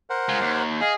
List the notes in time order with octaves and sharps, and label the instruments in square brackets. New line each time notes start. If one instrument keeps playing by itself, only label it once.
[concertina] A#4 C5 F#5
[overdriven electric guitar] G#3 F4
D#2
[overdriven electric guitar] G#4 [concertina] D#5 F5